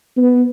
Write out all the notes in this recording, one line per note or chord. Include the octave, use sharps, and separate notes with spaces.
B3